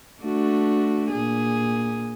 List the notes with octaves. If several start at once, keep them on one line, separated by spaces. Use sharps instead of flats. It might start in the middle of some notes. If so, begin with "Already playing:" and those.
A3 D4 F#4
A#2 G#4